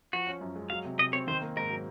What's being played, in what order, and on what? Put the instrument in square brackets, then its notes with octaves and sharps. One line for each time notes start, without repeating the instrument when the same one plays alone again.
[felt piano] F3 [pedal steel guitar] F#4
[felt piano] C#4
F#2
G#3
[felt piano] F#3 [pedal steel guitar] F5
[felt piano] C3
[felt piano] C3 [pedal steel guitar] D#5
[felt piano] C4 [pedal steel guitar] C#5
[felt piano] D#3 [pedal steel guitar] C5
[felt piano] A#3
[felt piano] G#2 [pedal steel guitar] A#4
[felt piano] F#3